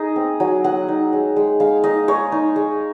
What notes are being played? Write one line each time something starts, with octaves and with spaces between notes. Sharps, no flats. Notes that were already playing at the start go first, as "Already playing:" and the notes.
Already playing: D#4 G#4 D#5
C4
F#3
F#3 F#5
D#4
G#3
G#3
G#3 F5
D#4 D#5
G#3 C#5
D#4
G#3